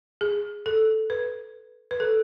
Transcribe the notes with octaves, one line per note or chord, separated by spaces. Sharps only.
G#4
A4
B4
B4
A4